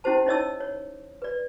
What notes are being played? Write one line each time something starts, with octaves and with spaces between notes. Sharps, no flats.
C#4 E4 G4 C5 A5
D#4 E4 C#5 D#5 A5 E6
C#5
B4 D5